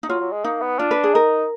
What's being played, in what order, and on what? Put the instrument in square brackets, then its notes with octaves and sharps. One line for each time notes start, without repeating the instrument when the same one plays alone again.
[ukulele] D#4
[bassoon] F#3 [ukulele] F4
[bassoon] F#3
G#3
[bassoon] A#3 [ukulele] D#4
[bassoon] B3
[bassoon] D4 [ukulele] F4
[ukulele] B4
G#4
[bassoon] D#4 [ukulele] A#4